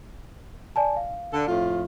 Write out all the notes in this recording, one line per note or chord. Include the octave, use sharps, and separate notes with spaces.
D5 G#5 A5
F5
D3 D4 A4
F2 A2 F4